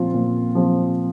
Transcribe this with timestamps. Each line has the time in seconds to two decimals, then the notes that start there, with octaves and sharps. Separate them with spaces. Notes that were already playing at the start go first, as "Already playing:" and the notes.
Already playing: A#2 F3 C4 F4
0.14 A#2
0.55 F3 C4 F4